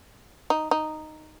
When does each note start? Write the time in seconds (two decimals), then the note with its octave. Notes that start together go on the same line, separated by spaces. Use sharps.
0.50 D#4
0.71 D#4